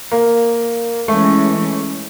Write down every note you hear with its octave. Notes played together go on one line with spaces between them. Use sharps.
A#3
E3 G#3 A3 C#4